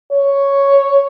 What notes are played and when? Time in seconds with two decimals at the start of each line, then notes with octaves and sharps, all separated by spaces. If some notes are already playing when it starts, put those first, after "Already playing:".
0.12 C#5